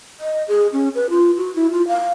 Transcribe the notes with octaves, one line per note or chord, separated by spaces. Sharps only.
D#5
G#4
C#4
B4
F4
F#4
E4
F4
F5